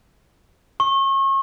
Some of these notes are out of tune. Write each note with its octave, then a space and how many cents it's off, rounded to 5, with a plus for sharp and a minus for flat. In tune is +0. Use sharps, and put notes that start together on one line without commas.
C#6 -35